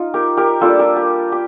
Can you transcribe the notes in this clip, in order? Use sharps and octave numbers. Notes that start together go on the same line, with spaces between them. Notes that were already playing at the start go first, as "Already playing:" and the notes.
Already playing: D#4 F4
G4 A#4
G4 A#4
G3 A#3 D4 F4 A4
G4 A#4
G4
G4